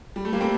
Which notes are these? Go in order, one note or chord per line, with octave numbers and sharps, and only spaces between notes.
G3
A3
G3 A#3
A3 C4